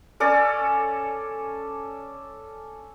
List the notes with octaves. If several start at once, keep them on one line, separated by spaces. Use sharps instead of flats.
C#4 A4 D5